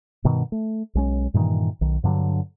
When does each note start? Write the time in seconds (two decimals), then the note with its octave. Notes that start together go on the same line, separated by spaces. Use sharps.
0.24 G2 B2 D#3
0.52 A3
0.95 B1 G#3 C#4
1.34 G2 A#2 D#3 E3
1.81 B1 D#3
2.04 G2 D3 F3 F#3